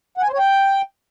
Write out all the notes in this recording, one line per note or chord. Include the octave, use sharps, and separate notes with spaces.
F#5
G#5
C5
C#5
G5